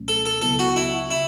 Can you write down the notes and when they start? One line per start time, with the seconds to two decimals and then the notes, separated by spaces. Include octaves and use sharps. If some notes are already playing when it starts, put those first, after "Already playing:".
Already playing: C#2 B2 F#3 A3 C#4
0.08 A4
0.26 A4
0.42 C#2 C#3 F#3 B3 E4 A4
0.59 F#4
0.76 E4
1.11 C#3 E4